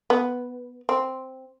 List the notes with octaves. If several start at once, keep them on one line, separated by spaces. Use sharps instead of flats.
B3
C4